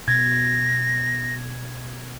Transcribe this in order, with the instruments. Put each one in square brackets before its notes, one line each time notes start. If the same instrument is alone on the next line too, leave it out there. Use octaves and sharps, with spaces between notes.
[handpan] B2 [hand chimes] G#6 [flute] A#6